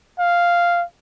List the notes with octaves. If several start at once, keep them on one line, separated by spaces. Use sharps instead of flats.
F5